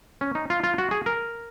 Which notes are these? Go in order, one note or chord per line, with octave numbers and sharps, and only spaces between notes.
C#4
D#4
F4
F4
F#4
G#4
A#4